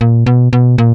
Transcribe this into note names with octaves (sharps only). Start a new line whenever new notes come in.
A#2
B2
B2
A#2